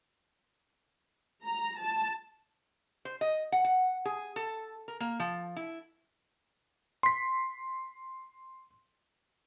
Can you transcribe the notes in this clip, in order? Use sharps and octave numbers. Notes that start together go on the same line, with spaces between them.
A#5
A5
C5
D#5
F#5
F#5
G#4
A4
A#4
A#3
F3
E4
C6 B6